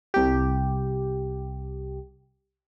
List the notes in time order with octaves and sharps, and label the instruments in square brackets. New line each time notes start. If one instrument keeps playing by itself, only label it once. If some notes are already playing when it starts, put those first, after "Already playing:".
[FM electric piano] C2 G4